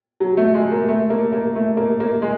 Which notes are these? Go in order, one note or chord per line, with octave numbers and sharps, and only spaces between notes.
F#3
A3
G#3
A#3
A3
A#3
A#3
A3
A#3
A#3
G#3